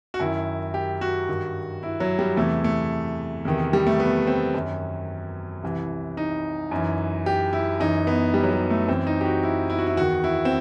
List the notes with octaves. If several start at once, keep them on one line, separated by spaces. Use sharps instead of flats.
F#4
F#2 D#3 E4
G4
F#4
G2 D#3
E4
F#3
G3
E2 C3 E3 A3
A3
E2 C3 D#3
G3
A3
B3
C4
F#2 D#3
C2 C3 E3
D#4
F#2 E3
G4
E4
F#2 E3 D#4
B3
G3
F#3
G3
A3
F#2 E3 C4
D#4
G4
F#4
E4
E4
F#4
E4
E2 D#3 F#4
E4
C4